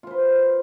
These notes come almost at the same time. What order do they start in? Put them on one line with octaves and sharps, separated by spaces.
F4 C5 B4